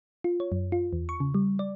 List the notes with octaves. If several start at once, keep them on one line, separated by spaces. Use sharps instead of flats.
F4
C#5
F#2
F4
E2
C#6
C#3
G3
D5